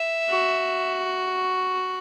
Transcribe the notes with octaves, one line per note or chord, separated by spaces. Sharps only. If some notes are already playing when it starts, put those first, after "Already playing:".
Already playing: E5
F#4